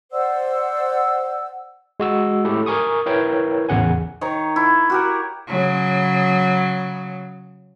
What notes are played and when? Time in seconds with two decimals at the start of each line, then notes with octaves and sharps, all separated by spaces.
0.12 C5 D5 F#5 E6
2.00 G#3 F#4 E6
2.44 A3 E4 G4 A4
2.66 A#4 G#5 C#6 D#6
3.06 E4 A#4 B4 C#5 G5
3.69 A1 E2 C#3 F#5 G#5
4.21 D#3 D#4 C#5 A#5
4.56 E4
4.90 F#4 G4 A#4
5.48 C#3 F#3